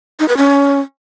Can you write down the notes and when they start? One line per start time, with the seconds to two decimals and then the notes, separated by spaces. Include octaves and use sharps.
0.20 D#4
0.28 B4
0.37 C#4